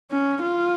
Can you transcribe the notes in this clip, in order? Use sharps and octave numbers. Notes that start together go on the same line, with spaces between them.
C#4
F4